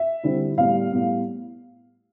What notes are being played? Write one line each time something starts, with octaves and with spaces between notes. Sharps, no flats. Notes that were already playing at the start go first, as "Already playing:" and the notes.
Already playing: E5
D3 G3 C4 E4
A2 G3 B3 F5
A2 G3 B3